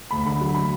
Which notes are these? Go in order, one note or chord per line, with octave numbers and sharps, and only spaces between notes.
D2 B5
D3 B5
F#3
B5